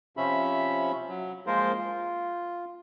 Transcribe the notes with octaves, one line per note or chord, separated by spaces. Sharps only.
C3 F3 C#4 E5 B5
F#3
F3 G#3 A#3 F4 A#4 C5
F4